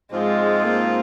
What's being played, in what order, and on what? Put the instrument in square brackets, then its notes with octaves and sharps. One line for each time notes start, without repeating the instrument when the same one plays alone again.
[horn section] G#2 F3 C4 F4 [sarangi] G#3
[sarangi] A#3